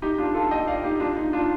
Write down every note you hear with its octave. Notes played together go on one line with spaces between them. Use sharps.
D#4 G4
D4 F4
F4 A4
D#5 G5
D5 F5
D#4 G4
D4 F4
D#4
D4 F4